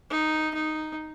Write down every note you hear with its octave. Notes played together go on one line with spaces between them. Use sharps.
D#4
D#4